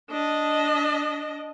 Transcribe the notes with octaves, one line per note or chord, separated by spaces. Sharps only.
D4 D#5